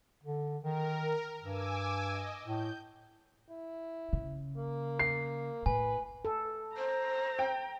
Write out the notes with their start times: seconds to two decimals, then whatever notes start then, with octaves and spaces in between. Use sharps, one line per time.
0.24 D3
0.64 D#3 A#4
1.43 G2 G#5 D6 E6
2.10 D#5
2.45 A2 G6
3.50 E4
4.13 C#3
4.57 A#3
4.99 C7
5.66 A2 B4 G#5
6.25 A4
6.77 C5 A#5
7.39 G5